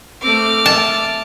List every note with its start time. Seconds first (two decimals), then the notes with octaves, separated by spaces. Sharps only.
0.22 A3 C4 D6 F6
0.66 E5 A5